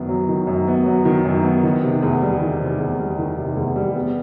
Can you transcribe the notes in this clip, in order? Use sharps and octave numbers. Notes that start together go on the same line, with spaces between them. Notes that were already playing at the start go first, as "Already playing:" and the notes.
Already playing: F#2 D#3 B3
F#3
D#3
F#2
B3
F#3
D#3
F#2
B3
D#3
C3
E2
G3
D#3
C3
E2
G3
D#3
C3
E2
G3
B3